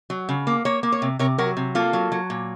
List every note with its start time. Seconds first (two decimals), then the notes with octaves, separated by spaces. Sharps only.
0.10 F#3
0.29 C#3
0.47 A#3
0.65 A#3 C#5
0.83 A#3
0.92 C#5
1.02 C3
1.19 C3 A#4 C#5
1.38 F#3 F#4 A#4
1.57 C3
1.75 A#3 F4 A4
1.93 F#3
2.12 F#3
2.30 A#2